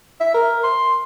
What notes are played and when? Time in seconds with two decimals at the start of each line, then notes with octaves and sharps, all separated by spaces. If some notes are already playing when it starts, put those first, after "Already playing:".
0.20 E5
0.34 A#4
0.63 C6